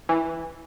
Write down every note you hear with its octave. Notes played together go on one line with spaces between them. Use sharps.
E3